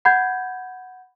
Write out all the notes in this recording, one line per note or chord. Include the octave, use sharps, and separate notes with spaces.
F#5 B5 G6 G#6